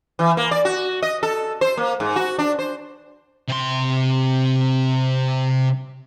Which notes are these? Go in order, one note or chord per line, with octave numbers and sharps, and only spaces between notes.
E3
A#3
D5
F#4
D#5
A4
C5
A#3
G#2
F#4
D4
C5
C3 C6